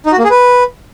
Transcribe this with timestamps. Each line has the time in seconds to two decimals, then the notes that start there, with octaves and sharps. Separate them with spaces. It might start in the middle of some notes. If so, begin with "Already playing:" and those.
0.06 D#4
0.12 F#4
0.18 A#3
0.24 G#4
0.30 B4